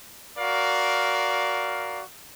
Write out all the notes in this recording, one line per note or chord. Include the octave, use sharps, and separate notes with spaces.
F#4 A#4 D5 F5